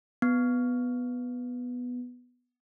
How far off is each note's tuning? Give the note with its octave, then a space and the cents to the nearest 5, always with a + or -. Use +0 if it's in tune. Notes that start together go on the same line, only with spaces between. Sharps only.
B3 +0